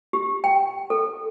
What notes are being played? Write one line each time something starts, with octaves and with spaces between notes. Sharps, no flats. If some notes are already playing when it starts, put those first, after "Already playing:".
G4
G5
A4